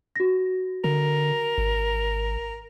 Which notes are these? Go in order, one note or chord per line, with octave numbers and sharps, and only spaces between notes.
F#4 A#6
D3 A#4
G#1